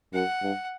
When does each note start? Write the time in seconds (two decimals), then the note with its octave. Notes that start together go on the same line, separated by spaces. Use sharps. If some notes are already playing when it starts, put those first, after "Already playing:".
0.14 F#2 F#5
0.43 G2